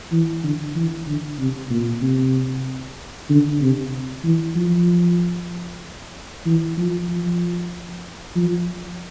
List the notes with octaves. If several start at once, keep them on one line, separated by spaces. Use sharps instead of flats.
E3
D3
E3
D3
C3
A#2
C3
D3
C3
E3
F3
E3
F3
F3
F3